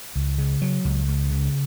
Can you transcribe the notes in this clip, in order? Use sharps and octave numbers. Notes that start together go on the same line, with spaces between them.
C#2
C#3
F#3
C#2
C#2
C#3